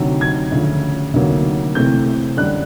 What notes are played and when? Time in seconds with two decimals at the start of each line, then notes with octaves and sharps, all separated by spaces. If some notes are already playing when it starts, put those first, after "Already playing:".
Already playing: D2 C3 D#3 F#3
0.21 G#6
0.52 D2 C#3 F3
1.13 D2 C3 D#3 F#3 A#3
1.75 C3 E3 A3 C4 G6
2.37 F#2 D3 G3 F#6